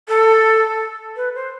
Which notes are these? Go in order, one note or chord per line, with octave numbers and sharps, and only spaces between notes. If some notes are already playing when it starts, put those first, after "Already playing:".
A4
B4
C5